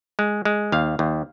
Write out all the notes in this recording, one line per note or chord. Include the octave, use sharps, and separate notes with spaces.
G#3
G#3
D#2 F5
D#2